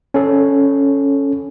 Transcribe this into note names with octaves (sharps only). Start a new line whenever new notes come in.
C#4 A4